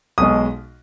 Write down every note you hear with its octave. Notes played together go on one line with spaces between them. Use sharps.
B1 B2 G#3 D#6